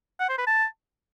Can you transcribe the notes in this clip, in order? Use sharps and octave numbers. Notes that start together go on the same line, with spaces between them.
F#5
C5
B4
A5